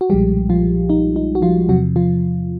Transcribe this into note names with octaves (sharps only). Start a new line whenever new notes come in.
F#4
B1 A#2 F3 G3 G#3 G4
F3 F4
D#4
D#4
F#4
F3 F4
E2 C3 F3 F#3 F#4
F3 F4